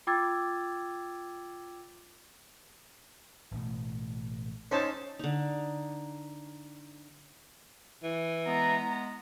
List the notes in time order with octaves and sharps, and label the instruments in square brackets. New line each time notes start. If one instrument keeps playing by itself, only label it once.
[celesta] F4 G5 D6 E6 G#6 A6
[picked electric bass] A1 B2 A3
[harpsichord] C#4 D#4 [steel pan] C5 C#5 A5
[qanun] D3 D#4
[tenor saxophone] E3
[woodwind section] G#3 B3 [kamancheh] A#5